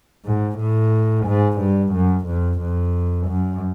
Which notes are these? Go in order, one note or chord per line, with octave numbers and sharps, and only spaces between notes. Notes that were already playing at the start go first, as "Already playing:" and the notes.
G#2
A2
G#2
G2
F#2
F2
F2
F#2